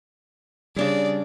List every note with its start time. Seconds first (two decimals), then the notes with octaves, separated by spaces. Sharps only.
0.76 C#3 G3 D4 G#4 D5